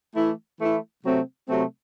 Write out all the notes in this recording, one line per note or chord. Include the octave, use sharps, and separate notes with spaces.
E3 A3 E4
E3 A3 E4
C3 F#3 A3 C4
C3 F#3 A3 C4